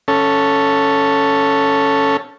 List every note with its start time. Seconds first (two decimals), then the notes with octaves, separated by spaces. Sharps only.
0.08 C#4 A4